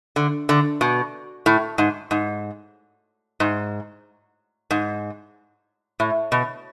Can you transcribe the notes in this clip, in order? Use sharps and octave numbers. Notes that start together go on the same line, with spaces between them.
D3
D3
B2
A2
G#2
G#2
G#2
G#2
A2
B2